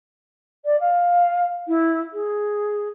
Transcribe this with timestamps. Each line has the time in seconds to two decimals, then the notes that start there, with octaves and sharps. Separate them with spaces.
0.65 D5
0.79 F5
1.68 E4
2.12 G#4